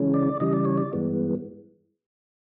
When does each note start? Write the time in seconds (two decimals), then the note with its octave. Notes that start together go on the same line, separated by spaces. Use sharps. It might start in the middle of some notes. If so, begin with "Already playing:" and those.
Already playing: C#3 E3 G#3 C#4
0.14 D5
0.40 C#3 E3 G3 D#5
0.53 D5
0.65 C#5
0.78 D5
0.93 G2 E3 G#3 B3